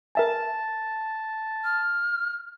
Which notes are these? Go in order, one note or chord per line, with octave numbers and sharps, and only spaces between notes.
A#4 E5 G#5 A5
F6